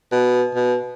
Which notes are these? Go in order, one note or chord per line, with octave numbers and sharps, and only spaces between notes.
B2
B2